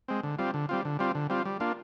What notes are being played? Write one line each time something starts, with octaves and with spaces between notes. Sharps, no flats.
G#3 C4
D3
G3 C4 F4
D3
G3 C4 F4
D3
G3 C4 F4
D3
G3 C4 F4
G3
A#3 D4 F4